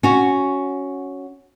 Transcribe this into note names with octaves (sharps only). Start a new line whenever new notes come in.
C#4 F#4